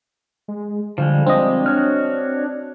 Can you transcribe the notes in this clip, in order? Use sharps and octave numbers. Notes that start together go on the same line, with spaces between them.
G#3
D3 F3 G3 G#3
C4 D4 D#5
F#4 C#5 F6